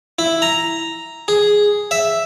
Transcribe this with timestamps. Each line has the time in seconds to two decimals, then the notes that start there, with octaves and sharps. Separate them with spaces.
0.19 E4
0.42 A#5
1.28 G#4
1.91 E5